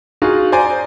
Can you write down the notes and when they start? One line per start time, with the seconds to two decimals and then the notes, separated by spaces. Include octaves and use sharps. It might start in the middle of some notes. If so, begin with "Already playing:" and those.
0.22 D#4 F4 F#4 G#4
0.52 C5 D5 G#5 A#5